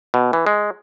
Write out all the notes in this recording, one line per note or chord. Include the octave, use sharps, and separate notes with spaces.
B2
E3
G#3